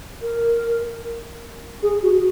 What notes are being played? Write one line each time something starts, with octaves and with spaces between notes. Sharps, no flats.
A#4
G#4
F#4